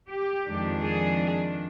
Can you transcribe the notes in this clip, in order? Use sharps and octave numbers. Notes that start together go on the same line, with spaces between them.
G4
F2 D#3 G#3 D4
G#4